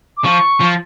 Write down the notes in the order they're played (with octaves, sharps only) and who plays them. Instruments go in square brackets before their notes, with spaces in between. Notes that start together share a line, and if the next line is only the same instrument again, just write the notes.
[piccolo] D6
[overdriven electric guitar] F3 [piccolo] C#6
[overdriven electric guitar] F3